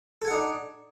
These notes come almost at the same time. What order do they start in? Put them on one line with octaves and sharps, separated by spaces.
A4 G#5 F#5 D#4 D4